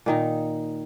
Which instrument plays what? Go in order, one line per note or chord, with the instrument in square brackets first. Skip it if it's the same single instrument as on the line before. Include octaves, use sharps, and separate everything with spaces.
[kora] A#2 D#3 D#4